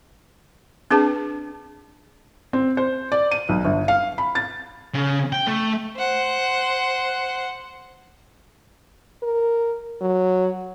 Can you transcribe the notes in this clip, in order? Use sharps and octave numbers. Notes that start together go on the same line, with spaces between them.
C4 D4 G#4 B4 A5
C4
C5
D5
D#7
B1
G1
F5
B5
A6
C#3
G5
A3
C5 F#5
A#4
F#3